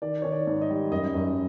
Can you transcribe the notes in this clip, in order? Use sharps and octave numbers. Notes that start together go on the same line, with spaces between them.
D#3 D5
D#3 C#5
D5
G#2
D#5
G3
F#2 D#5
F#2